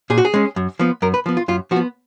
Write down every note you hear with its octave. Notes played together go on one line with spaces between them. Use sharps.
A#2 G#4
F#4
G#4
G#3 C#4
F#2
F3 B3
F#2 A#4
B4
F3 B3
F4
F#2 F4
F3 F#4
B3